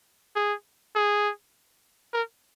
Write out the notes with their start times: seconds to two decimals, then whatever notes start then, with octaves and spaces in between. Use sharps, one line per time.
0.36 G#4
0.95 G#4
2.13 A#4